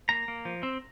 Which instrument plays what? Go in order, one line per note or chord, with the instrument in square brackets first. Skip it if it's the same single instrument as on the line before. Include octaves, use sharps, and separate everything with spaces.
[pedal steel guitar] A#3 A#5
A#3
F3
C4